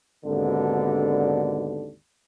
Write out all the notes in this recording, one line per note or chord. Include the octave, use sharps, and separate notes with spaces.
G#1 D#2 B2 D3